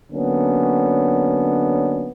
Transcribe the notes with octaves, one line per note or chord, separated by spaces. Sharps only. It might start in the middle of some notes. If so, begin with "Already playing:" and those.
D3 F#3 A#3 B3 C#4 D4